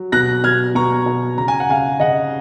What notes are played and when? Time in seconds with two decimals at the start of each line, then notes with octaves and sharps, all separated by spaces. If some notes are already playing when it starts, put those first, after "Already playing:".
Already playing: F#3
0.12 B2 F#6 A#6
0.43 B2 F6 G#6
0.75 B2 A#5 C#6
1.06 B2
1.38 C#3 A#5
1.48 G#5
1.60 F#5
1.69 C#3 F5 G#5
2.00 C#3 D#5 F#5